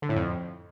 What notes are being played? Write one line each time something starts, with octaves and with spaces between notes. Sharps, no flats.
D3
A2
F2